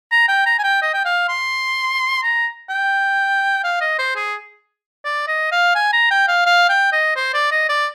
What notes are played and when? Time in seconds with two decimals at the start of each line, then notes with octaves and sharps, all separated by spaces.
0.12 A#5
0.29 G5
0.46 A#5
0.59 G#5
0.64 G5
0.82 D#5
0.94 G5
1.05 F5
1.29 C6
2.23 A#5
2.70 G5
3.64 F5
3.81 D#5
3.99 C5
4.16 G#4
5.05 D5
5.28 D#5
5.52 F5
5.75 G#5
5.93 A#5
6.11 G5
6.28 F5
6.46 F5
6.70 G5
6.93 D#5
7.16 C5
7.34 D5
7.52 D#5
7.69 D5